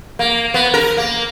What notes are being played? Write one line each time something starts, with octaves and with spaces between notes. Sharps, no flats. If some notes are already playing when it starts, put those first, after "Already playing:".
A#3
B3
A#4
A#3